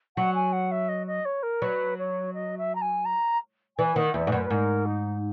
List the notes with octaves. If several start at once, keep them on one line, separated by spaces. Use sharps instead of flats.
F#3 F#5
G#5
F#5
E5
D#5
D#5
C#5
A#4
F#3 B4
C#5
D#5
E5
A#5
G#5
A#5
E3 G#5
D#3 F#5
E2 E5
G#2
F#2 B4
B4
G#2 A#4
D#4